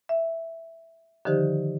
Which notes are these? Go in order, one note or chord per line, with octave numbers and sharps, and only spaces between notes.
E5
D3 D#3 F3 D#4 G4 C5